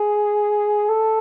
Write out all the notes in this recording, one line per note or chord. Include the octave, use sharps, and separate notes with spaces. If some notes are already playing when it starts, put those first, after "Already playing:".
Already playing: G#4
A4